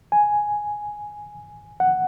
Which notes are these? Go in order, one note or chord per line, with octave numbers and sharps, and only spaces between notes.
G#5
F#5